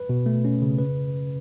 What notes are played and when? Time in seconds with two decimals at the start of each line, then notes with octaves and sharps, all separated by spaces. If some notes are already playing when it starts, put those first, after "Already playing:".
Already playing: B4
0.09 B2
0.26 A3
0.45 C#4
0.62 C#3
0.79 B4